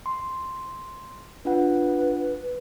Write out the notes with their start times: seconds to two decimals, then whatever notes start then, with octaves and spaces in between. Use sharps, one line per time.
0.06 C6
1.45 D4 F4 B4 F#5